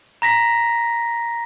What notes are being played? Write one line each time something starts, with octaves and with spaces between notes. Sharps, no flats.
A#5 A#6 B6